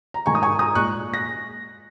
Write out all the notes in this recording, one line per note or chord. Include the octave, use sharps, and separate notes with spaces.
A#5
G#2 D#3 G#3 G#5 C#6
D#6
G#5 C#6
A#5 D#6
A#2 G#3 C#6 F#6
A#6